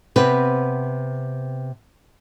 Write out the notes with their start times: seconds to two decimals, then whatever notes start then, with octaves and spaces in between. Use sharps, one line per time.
0.16 C3 B3 C4 B4